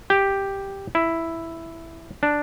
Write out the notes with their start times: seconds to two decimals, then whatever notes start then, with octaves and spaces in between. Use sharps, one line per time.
0.10 G4
0.95 E4
2.23 D4